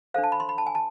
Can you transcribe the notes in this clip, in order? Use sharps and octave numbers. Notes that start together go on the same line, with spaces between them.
D4 A4 C5 F5
A5
B5
C6
B5
A5
G#5
A5